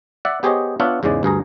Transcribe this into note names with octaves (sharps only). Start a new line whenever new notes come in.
D5 E5 F#5
B3 G4 G#4 C5 C#5 D#5
B3 D4 F4 C#5 E5 F#5
E2 G#2 C#3 G#3 D5
D2 G2 G#4 A#5